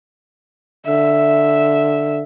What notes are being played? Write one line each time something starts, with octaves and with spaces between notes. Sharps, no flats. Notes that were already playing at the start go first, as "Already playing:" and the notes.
D3 E5